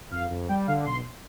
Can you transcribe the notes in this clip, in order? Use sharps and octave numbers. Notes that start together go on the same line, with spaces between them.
F2 F5
F2
G3 G5
D3 F5
B1 C6